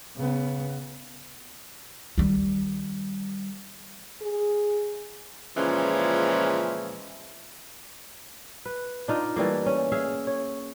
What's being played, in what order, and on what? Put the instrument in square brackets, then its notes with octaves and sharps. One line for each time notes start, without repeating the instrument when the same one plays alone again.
[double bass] C#3 B3
[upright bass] D#3 G3
[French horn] G#4
[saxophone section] A#2 C#3 E3 F3 G#3 C#4
[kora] B4
D4 D#4 F4
E3 G3 A3 A#3
C#4
G#4 E5 F5
C#5